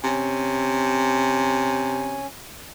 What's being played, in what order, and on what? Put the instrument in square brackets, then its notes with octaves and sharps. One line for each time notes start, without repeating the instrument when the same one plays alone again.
[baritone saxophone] C3 [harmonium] C#4 G#5